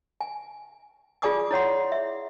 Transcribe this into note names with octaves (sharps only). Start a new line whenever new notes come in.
G#5
F4 G#4 D5 G#5 D6 D#6
E4 C#5 F#5 C6
E5